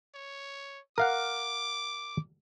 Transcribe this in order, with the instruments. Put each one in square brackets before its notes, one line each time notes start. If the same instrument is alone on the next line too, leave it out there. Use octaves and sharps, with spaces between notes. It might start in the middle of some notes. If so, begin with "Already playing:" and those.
[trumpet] C#5
[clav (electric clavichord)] A#4 F5 F#5 [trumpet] D6